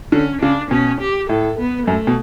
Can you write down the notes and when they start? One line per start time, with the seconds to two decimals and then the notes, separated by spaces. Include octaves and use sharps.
0.12 D3 C#4
0.41 C#3 D4
0.71 B2 C#4
1.00 G4
1.29 A2 A4
1.59 B3
1.87 F#2 A3
2.07 B2